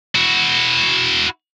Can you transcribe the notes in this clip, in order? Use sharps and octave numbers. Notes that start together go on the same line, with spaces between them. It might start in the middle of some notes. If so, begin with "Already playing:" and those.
E4 F#4